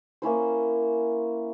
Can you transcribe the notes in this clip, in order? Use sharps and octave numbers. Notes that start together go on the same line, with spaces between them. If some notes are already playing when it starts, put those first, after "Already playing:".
A#3 C#4 E4 C5